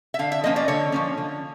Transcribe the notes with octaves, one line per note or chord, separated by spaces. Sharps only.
E5
D3 F5
E5
F3 A#3 C#4 D#5
D5
D3 C#5
F3 A#3 C#4
D3